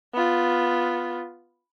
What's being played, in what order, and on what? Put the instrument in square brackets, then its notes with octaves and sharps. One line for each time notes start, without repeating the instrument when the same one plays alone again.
[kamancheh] B3 F4